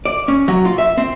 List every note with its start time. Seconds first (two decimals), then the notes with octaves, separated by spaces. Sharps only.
0.05 D5
0.28 C#4
0.48 F#3
0.65 F4
0.78 E5
0.98 C4